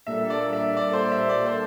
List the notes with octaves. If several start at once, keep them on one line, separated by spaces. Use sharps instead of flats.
A#2 G3 A#3 D4 A4 E5
D5
E5
D5
C5
E5
D5
C5